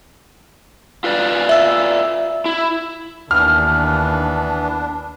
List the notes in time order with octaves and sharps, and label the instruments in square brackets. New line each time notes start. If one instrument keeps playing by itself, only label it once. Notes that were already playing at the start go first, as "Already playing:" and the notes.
[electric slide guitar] F4 B4 D5
[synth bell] E5 E6
[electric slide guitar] E4
[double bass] D#2 D#3 [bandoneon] E3 B3 [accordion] D4 [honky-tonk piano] F6